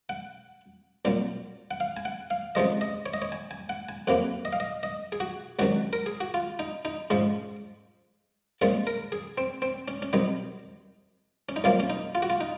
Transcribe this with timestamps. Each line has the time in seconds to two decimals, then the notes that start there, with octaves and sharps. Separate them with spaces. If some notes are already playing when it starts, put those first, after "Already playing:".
0.09 F#5
1.05 C2 A#2 F#3
1.71 F#5
1.80 F5
1.97 G#5
2.05 F#5
2.30 F5
2.55 C#2 C3 F3 G#3 D#5
2.81 D#5
3.06 C#5
3.14 D#5
3.22 C#5
3.32 G#5
3.51 G#5
3.69 F#5
3.89 G#5
4.07 F2 C3 F#3 A#3 F#5
4.45 D#5
4.53 F5
4.60 D#5
4.83 D#5
5.12 G#4
5.20 F#4
5.59 C#2 C3 D#3 F#3 F#4
5.93 A#4
6.06 G#4
6.20 F#4
6.34 F4
6.59 D#4
6.85 D#4
7.10 G#2 F3 G#3 C#4
8.61 C2 A#2 F3 G#3 C#4
8.87 A#4
9.12 G#4
9.38 C4
9.62 C4
9.88 C#4
10.02 C#4
10.13 C2 C3 F#3 D#4
11.49 C#4
11.56 D#4
11.64 C2 C3 F#3 A#3 F4
11.80 C#4
11.90 D#4
12.15 F4
12.22 F#4
12.30 F4
12.41 D#4